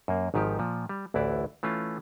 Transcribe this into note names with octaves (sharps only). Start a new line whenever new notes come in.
F#2 A#3
G#1 G#2 D#3 F3 G4
A#2 F3
G3
A1 D2 E3 E4 D5
E3 A3 C#4 F4